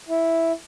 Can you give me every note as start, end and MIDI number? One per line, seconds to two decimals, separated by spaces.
0.08 0.52 64